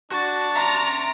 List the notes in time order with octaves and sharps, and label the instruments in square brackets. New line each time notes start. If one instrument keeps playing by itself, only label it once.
[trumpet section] D4 A5 [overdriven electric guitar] F#4 [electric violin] C#6 A6
[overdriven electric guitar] E5 C6 [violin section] A#5